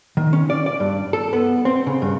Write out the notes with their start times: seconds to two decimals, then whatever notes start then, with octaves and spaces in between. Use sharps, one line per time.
0.17 D#3
0.33 C#4
0.50 D5
0.66 D5
0.80 G2
1.13 A4
1.33 B3
1.65 C4
1.87 C#3
2.02 G2